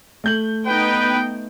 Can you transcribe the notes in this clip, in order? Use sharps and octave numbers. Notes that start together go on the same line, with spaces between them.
A3 G6 F#7
B3 D#4 B4 G5